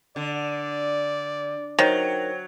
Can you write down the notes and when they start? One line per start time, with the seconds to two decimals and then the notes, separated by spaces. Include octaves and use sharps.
0.16 D3 D5
1.79 D#3 F#3 C5 C#5 G5